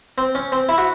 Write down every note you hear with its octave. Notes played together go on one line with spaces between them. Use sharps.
C4
C#4
C4
E4
F#4